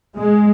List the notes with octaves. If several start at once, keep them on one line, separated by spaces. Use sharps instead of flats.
G#3